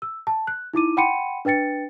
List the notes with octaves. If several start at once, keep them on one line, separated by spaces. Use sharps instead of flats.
E6
A5
F#6
D#4 E4 D6 D#7
F#5 G5 B5 C6 C#7 D#7
D4 B4 G5 A6 C#7